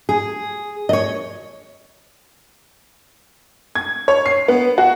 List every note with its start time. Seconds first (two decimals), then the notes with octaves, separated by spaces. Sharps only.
0.09 G#4
0.89 C#5 D#5
3.75 G#6
4.08 C#5
4.26 C7
4.48 B3
4.78 F#4